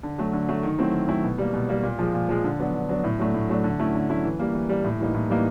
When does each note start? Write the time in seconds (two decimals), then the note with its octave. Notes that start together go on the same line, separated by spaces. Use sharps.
0.03 D3
0.18 F#3 A3
0.33 D3
0.48 F#3 A3
0.63 D#3
0.78 F#3 A3 C4 E4
0.94 D#3
1.09 F#3 A3 C4 E4
1.24 B2
1.38 G3 A#3
1.53 B2
1.69 G3 A#3
1.83 A#2
1.99 F3 G#3
2.14 A#2
2.29 F3 G#3
2.44 D3
2.59 F#3 B3 D4
2.74 D3
2.89 F#3 B3 D4
3.04 A2
3.19 F#3 A3 D4
3.34 A2
3.49 F#3 A3 D4
3.64 D3
3.79 F#3 A3 C#4 E4
3.95 D3
4.09 F#3 A3 C#4 E4
4.24 E3
4.39 G3 A#3
4.54 E3
4.69 G3 A#3
4.84 A2
5.00 E3 G3 A#3 D#4
5.14 A2
5.30 E3 G3 A#3 D#4